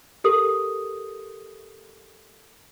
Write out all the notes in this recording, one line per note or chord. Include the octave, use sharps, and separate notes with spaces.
G4 A4 A#4 D#6